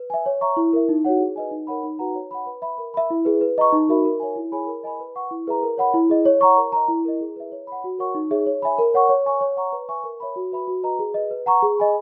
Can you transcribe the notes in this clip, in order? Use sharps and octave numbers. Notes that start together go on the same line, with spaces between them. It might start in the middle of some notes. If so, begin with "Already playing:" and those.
Already playing: B4
E5 G#5
C#5
E5 A#5 C#6
E4
A#4 E5
D#4
F#4 C#5 F#5
G#4
B4 D#5 G#5
D#4
A#4 C#5 F#5 B5
D#4
F#4 B4 F#5 A#5
C#5
F#5 B5
B4
E5 B5
A#4
E5 B5
E4
G#4 B4 E5
B4
D#5 A#5 C#6
D#4
F#4 A#4 E5 B5
A#4
C#5 E5 G#5
E4
G#4 C#5 G#5 B5
A#4
D#5 G#5 B5
B4
F#5 C#6
E4
G#4 B4 E5 A#5
A#4
C#5 F#5 B5
E4
G#4 D#5
C#5
F#5 A#5 C#6
A#4
D#5 A#5
E4
A#4 D#5
G#4
B4 E5
C#5
F#5 B5
F#4
A#4 C#5 F#5 C#6
D#4
G#4 C#5 E5
C#5
E5 G#5 B5
A#4
C#5 F#5 C#6
C#5
G#5 C#6
C#5
F#5 A#5 C#6
B4
E5 G#5 C#6
A#4
C#5 E5 B5
F#4
B4 E5 B5
F#4
B4 D#5 A#5
G#4
B4 D#5
B4
F#5 A#5 C#6
G#4
D#5 G#5 B5